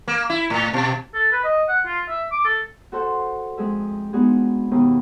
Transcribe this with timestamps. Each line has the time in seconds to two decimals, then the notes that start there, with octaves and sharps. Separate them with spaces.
0.08 A#3
0.30 E4
0.50 A2
0.74 B2
1.14 A4
1.32 B4
1.44 D#5
1.68 F#5
1.86 F4
2.09 E5
2.31 D6
2.44 A4
2.92 F#4 A4 C5 F#5
3.57 F2 G#3 G#4 E5
4.13 G#3 B3 D4 D#4 F#4 G#4
4.71 D#2 B2 A#3 B3 D#6